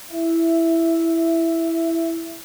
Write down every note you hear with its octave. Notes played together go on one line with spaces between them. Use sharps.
E4 E5